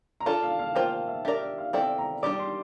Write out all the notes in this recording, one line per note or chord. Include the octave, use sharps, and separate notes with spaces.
A#5
D4 F4 A4 A5
F5
F5
A#3 F4 C5 G5
G5
E5
D4 G4 A#4 D5 E5
E5
F5
C4 E4 A4 D5 G5
A#5
G3 D4 G4 D5 D6
C6